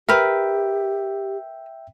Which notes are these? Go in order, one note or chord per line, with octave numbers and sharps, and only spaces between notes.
G4 A#4 B4 E5 G5